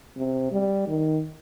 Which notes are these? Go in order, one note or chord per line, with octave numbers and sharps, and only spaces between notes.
C3
G3
D#3